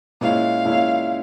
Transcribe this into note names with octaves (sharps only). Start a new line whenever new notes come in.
A#2 G#3 C#4 E4 F5
A#2 G#3 C#4 E4